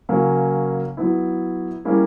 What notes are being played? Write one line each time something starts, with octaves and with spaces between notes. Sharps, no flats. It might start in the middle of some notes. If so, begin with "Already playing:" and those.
C#3 F#3 A#3 C#4
F#3 B3 E4
G3 A#3 C#4 E4 G#4